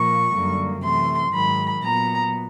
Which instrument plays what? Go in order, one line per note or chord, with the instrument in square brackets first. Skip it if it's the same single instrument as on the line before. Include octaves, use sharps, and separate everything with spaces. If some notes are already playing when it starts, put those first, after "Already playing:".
Already playing: [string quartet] A#2 F3 A#3 C#6
F#2 D3 G3 A#3
C3 E3 A3 C6
G#2 D#3 F#3 B5
A#2 F#3 B3 A#5